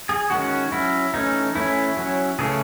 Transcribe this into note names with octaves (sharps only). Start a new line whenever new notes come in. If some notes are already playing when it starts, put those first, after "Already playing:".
G#4
D#3 G#3 C#4 F#4
F#3 C#4 E4
E3 A3 C#4 D#4
E3 A3 C#4 E4
F#3 C#4
C#3 E3 A3 C#4 G#4